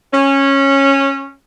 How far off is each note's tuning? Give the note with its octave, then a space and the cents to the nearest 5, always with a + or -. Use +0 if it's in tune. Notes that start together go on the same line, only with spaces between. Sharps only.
C#4 -15